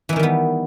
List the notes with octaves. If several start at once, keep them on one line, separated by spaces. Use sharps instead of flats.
D#3 E3 G3 B3 D#4